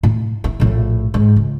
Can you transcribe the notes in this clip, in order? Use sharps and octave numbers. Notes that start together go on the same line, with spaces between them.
A2
E4
A#1 A2
G#2
C#2